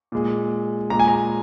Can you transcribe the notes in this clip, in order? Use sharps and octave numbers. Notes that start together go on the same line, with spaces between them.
A#2 G#3
A#2 G#3 A#5
G#5
A#5